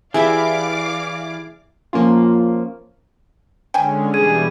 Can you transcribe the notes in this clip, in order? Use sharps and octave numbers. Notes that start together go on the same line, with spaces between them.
E3 E4 G4 G#4 D5 E5 F5 D6
F3 A#3 C#4 F4
D3 G#3 C#4 G5 G#5
B2 E3 G3 G#4 G#6 D#7